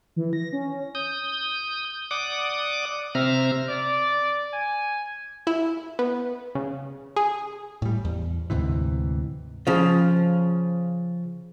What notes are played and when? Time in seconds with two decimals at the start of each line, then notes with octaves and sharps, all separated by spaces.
0.16 E3
0.33 A#6
0.53 C#4
0.95 D#6 G6
2.11 D5 F#5 D6 D#6
3.15 C3 C4 E5 A#5 F6
3.69 D5
4.53 G#5
5.47 E4
5.99 B3
6.55 C#3
7.16 G#4
7.82 A2 G3
8.05 E2
8.50 D2 G#2 C3 E3
9.67 C#3 F3